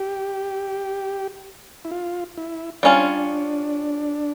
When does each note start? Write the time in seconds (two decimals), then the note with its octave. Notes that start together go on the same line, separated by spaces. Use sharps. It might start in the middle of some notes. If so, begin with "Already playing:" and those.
Already playing: G4
1.85 E4
1.91 F4
2.38 E4
2.83 G3 C#4 D4 F4 C#5